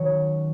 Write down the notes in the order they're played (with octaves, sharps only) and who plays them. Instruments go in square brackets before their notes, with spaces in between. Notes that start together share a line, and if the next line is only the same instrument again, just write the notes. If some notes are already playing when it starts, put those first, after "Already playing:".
Already playing: [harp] D#3 F#3 C#4 F#4